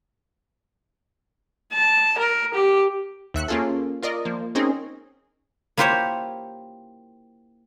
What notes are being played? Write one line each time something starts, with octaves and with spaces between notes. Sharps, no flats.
A5
A#4
G4
D#2 E5 F#6 C#7
A#3 C#4 F4 G#4 A4
F4 A#4 D5 D#5
F3 A#3
C4 C#4 D#4 G#4 A#4
A#3 E4 F4 G4 C5 C#5